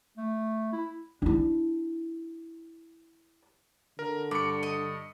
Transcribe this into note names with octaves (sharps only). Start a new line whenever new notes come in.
A3
E4
D4 E4
D3 A#4
G2 D5 C#7
D#5